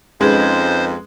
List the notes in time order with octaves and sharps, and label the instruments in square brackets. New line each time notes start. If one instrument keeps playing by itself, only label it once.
[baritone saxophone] F2 [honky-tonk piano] G#3 [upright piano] C#4 D#4 B4 [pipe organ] C5